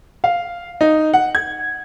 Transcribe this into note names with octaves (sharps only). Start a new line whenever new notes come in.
F5
D#4
F#5
G#6